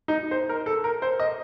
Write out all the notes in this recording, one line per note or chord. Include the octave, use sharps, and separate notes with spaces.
D#4
C5
A#4
A4
A#4
C5
D#5